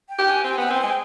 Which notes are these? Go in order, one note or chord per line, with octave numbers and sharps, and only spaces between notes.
G5
G4
G#5
C4 G5
G#5
B3 G5
G#5
C4 G5
G#3 G#5
G5